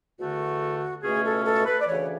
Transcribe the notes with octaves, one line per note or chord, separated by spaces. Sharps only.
E2 D3 A3 F#4
C#2 B2 A3 C#4 G#4
A4
A4
B4
D5
D2 C#3 E3 C#5